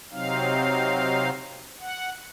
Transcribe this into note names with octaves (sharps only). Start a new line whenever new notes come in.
C3 F#3 C4 D#4 F5
F#5